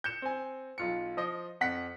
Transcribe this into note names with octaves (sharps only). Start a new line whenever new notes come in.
G6 C#7 E7
C4 G#5
B1 F4 C#7
F3 C5 D#5
F2 F#5 B6